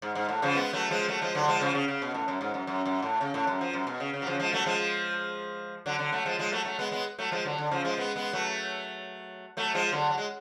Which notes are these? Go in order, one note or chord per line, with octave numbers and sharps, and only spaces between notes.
G#2
G#2
A2
C#3 F3
G#3 B3
F#3 A3
F3 G#3
F#3 A3
F3 G#3
D3 F#3
F3 G#3
C#3 F3
C#3
C#3
B2
A2
F#2
G#2
F#2
F#2
F#2
A2
C#3
A2
F#2
F3
F#2
B2
C#3
C#3
F#3
C#3 F3
F3 G#3
F#3 A3
F3 G#3
D3 F#3
D3 F#3
F#3 A3
F3 G#3
F3 G#3
F#3 A3
F#3 A3
G#3 B3
G#3 B3
F#3 A3
F3 G#3
D3 F#3
D3
C#3 F3
F3 G#3
G#3 B3
G#3 B3
F#3 A3
F#3 A3
F3 G#3
D3 F#3
F#3
G#3